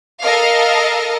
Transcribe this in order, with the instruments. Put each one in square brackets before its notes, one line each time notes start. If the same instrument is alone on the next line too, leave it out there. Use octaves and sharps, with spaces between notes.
[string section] A4 A#4 D#5 F5